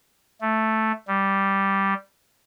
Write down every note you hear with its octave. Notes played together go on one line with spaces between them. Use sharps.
A3
G3